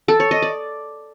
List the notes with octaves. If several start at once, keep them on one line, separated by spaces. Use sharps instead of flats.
A4
C#5
D#5
D5